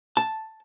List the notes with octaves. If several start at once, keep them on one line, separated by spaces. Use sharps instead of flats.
A5